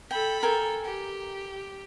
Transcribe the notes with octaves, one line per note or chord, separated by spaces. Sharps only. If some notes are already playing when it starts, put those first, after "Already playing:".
A4 G5 B5
A4 A#4 G5 G#5
G4